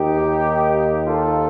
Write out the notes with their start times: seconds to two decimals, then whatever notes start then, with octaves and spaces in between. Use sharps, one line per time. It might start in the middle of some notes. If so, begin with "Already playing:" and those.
Already playing: D#2 D#3 A#3 D#4 G4
1.04 F4 A4